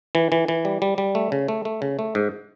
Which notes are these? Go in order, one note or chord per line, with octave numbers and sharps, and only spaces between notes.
E3
E3
E3
G3
G3
G3
A3
C#3
A3
A3
C#3
A3
G#2